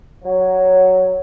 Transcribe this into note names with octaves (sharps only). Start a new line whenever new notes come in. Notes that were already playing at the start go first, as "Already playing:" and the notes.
F#3